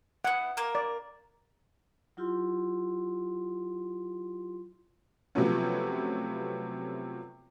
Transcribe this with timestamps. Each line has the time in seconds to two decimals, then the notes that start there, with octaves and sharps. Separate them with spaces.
0.25 B3 E4 F#5
0.57 A#3 A#4
0.75 D5
2.17 F#3 E4 F4 G4 C6
5.35 C3 F3 F#3 A3 B3 C#4